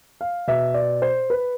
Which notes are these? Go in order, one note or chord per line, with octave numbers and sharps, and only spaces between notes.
F5
B2 E5
D5
C5
B4